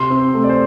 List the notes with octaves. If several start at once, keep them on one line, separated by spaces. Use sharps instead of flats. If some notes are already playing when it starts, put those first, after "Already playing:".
Already playing: C3 C6
C4
A3
D5
C5